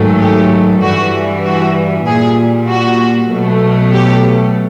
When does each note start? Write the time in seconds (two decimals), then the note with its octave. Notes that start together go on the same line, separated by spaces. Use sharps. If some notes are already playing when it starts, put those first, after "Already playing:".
Already playing: G#2 D#3 F#3 A3
0.20 G4
0.81 G2 E3 G3 F#4
1.44 F#4
2.06 A#2 G3 G#4
2.68 F#4
3.31 B2 F#3 A3
3.92 G4